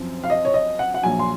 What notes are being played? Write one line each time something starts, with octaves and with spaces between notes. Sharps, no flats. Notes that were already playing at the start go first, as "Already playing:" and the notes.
Already playing: F#2 F3 C4
F5
D#5
C#5
D#5
F#5
F#5
A#1 A#2 F#3 G#5
C6